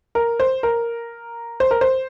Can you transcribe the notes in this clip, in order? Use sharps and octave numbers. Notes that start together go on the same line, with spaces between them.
A#4
C5
A#4
C5
A#4
C5